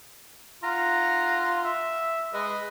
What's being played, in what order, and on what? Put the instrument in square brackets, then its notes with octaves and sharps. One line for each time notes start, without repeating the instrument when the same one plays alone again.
[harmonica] F4 F#5 C6 [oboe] A#5
[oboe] E5
[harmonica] G#3 D#5 [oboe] B4